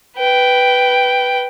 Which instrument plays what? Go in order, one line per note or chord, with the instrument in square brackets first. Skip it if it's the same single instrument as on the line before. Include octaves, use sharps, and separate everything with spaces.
[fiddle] B4 G5